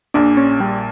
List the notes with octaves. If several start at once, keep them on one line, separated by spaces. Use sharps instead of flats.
A#1 A#2 D4
C#4
G3